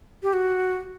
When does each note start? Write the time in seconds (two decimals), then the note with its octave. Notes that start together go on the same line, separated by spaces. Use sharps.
0.23 G4
0.33 F#4